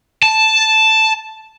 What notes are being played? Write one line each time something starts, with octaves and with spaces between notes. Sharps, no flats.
A5